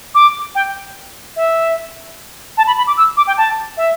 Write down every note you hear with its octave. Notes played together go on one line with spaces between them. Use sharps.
D6
G5
E5
A5
B5
B5
D6
E6
D6
G5
A5
E5